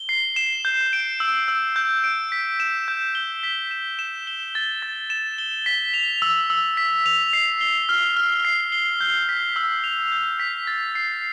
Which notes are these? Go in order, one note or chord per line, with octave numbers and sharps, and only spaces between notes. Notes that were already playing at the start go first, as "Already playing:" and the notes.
Already playing: G7
C7
E7
G6
D7
E6
E6
G6
D7
B6
E7
G6
G7
B6
E7
E7
G7
A6
A6
E7
G7
B6
F7
E6
E6
B6
F7
C7
G7
F6
F6
C7
G7
G6
B6
E6
F7
G6
B6
A6
C7